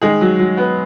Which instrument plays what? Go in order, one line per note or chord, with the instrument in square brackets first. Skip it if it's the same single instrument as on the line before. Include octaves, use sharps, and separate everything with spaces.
[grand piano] D#3 G#3 G#4
F#3
F#3
B3